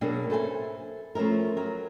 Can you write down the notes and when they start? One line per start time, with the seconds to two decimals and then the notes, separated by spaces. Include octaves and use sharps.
0.01 B2 F#3 A#3 D4 G#4
0.30 A4 B4 C5 E5 G5 G#5
1.15 F3 A3 C#4 E4 A#4
1.57 F#3 A#4